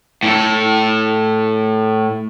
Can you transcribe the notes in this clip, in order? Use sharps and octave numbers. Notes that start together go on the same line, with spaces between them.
A2 A4